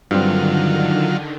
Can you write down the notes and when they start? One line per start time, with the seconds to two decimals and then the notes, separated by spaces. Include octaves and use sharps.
0.11 G2 D3 D#3 F#3 C4 F4